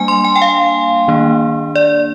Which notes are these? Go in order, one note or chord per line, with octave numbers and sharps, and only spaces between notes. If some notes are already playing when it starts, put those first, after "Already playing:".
Already playing: G3 A#3 D4 G#5
C6
G#5
G5
F5
D#3 A#3 D4
D5